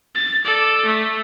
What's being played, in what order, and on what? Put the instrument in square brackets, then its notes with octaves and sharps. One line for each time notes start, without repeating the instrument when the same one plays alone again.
[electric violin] A6
A4 D5
A3